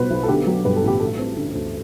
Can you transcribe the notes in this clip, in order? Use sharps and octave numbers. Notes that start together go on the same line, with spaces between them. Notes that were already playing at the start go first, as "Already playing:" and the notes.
Already playing: B1 B2 G3 B3 B4 C5
B1
A4
D3 G4
F#3
G2 B4
A4
A1 G4
A3 A4
C4
D3
D2